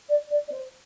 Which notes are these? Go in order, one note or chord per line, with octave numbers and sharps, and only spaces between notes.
D5
D5
D5
C5